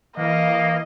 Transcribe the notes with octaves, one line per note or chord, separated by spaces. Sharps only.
E3 A#3 D#5 F5